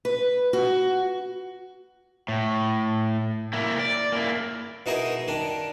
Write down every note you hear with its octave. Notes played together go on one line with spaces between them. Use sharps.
B4
F#4
A2
A#3 E4
D5
A#3 E4
B2 D#4 E4 G#4 A#4
D#3 D4